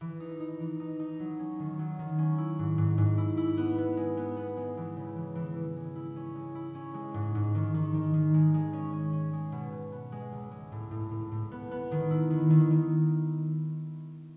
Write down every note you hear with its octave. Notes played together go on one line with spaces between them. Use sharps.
E3
D#4
D#4
E3
D#4
D#4
F#3
C#4
D#3
F#3
D#3
C#4
E4
G#2
G#2
G#2
E4
E4
B3
B3
G#3
B3
B3
G#3
E3
C#3
E3
E3
E3
G#3
E4
C#4
G#3
E4
C#4
G#3
G#2
G#2
D#3
D#3
D#3
D#3
G#3
G#3
C#4
C#4
C#4
G#3
B2
B2
B3
G#3
C#2
G#3
A2
A2
A2
A2
B3
B3
D#3
E4
D#3
D#3
D#3